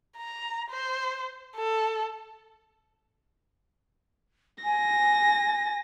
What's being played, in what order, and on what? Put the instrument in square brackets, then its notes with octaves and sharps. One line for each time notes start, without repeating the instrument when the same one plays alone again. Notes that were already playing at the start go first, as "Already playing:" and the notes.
[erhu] A#5
C5
A4
[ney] G#5 [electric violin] A#6